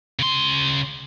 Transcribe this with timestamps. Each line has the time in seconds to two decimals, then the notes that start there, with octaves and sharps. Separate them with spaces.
0.19 C#3 C6